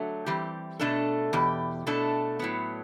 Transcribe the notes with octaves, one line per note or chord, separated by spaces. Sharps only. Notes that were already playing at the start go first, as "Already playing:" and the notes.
Already playing: D3 F#3 A3
E3 G3 C4 G4
B2 A3 D4 A4
E2 B2 G4
B2 A3 D4 A4
A2 F#3 B3